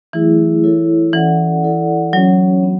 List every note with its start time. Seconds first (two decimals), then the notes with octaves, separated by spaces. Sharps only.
0.13 E3 F#3 A3 E4 G#4
0.64 E4 A4 C#5
1.13 E3 C#4 F#4 A4 D5 F#5
1.63 E4 A4 D5 F#5
2.13 F#3 C#4 F#4 C#5
2.63 B3 D4